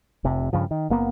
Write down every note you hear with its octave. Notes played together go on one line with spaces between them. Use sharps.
F1 C3
G2 C#3 F3
D#3
F#1 A#3 B3